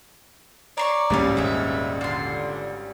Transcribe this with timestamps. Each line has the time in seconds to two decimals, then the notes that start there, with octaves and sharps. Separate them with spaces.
0.78 C#5 D5 A#5 C6 C#6
1.10 G#1 C#2 A2 G3 A#3 C#4 D4 F5
1.37 D#1 G#2 G#3 E5 F5
2.01 D3 F4 C6